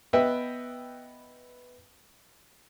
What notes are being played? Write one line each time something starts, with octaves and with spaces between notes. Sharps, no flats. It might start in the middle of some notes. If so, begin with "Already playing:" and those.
B3 B4 D#5 E5 G5